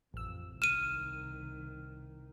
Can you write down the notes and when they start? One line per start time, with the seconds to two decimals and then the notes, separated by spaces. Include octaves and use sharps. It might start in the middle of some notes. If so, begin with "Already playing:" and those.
0.14 A1 F2 E6
0.62 C2 D#3 F6 D#7 E7